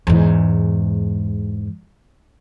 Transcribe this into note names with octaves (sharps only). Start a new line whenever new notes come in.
E2 G#2